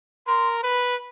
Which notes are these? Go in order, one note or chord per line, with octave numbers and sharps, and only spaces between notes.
A#4 C6
B4